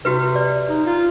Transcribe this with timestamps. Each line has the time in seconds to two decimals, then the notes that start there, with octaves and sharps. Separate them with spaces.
0.05 C3 F#4 G4 B4
0.36 D5
0.69 D#4
0.87 F4